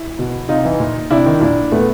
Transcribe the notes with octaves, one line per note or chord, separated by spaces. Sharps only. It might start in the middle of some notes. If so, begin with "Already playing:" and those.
Already playing: E4
B2
C3 D#4 F4
E3
A#2
C3 D4 E4
D#3
A#2 D4 E4
A#2 A3 B3